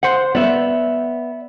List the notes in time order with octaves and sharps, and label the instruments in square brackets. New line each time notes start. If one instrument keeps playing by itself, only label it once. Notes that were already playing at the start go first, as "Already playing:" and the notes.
[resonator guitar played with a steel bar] C5 F#5
[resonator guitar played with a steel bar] B3 [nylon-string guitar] D5 E5